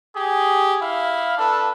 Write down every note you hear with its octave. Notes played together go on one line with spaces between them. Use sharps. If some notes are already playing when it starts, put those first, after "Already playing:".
G4 G#4
E4 F5
D4 A4 B4